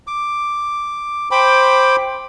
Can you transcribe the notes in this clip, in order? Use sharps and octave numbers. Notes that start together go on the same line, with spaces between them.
D6
C5 G5 B5 D6